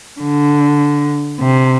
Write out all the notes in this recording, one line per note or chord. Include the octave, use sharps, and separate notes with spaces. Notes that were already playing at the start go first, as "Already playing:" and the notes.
D3
C3